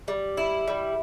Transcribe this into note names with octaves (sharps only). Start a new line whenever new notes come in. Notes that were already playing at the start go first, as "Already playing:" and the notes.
G3
E4
G3